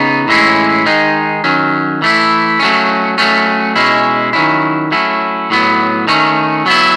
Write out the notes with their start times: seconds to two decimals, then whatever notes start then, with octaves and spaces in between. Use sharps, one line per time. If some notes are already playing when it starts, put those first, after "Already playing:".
Already playing: C#3 B3 D#4
0.28 A2 E3 G#3 C#4 E4
0.85 D#3 G#3 D#4
1.44 D#3 F#3 C#4
2.02 E3 A3 E4
2.59 F#3 A3 C#4
3.18 F#3 A3 C#4
3.76 B2 G#3 C#4 E4
4.33 D#3 F#3 C#4 E4
4.91 F#3 A3 C#4 E4
5.50 A2 F#3 B3
6.07 D#3 A3 C#4
6.66 F#3 B3 E4